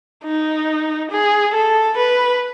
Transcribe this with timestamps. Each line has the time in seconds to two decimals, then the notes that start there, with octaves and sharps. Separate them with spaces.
0.24 D#4
1.11 G#4
1.54 A4
1.98 B4